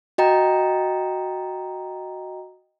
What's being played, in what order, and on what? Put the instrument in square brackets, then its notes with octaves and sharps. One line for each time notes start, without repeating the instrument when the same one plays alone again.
[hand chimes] F#4 D#5 G5 A#5